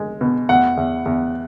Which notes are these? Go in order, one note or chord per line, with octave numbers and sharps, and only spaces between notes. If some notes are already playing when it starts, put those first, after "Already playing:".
Already playing: G#3
B2
E2 F#5
E2
E2